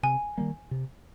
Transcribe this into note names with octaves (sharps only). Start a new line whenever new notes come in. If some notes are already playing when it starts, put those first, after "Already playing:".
C3 G#5
D#3 G3 A#3
C3